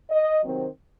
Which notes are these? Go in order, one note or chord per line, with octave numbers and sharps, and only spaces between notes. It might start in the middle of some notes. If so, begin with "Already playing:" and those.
D#5
C3 D#3 F#3 C4